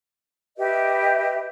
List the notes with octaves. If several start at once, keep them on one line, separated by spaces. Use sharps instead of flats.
G4 B4 D#5 E5